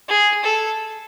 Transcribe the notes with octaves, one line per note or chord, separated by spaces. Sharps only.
G#4
A4